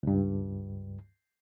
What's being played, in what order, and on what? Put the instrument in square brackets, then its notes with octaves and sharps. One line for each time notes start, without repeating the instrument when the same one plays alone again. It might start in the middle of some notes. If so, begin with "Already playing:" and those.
[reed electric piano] C#2 G2